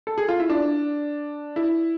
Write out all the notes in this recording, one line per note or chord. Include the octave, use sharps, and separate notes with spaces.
A4
G#4
F4
E4
D4
E4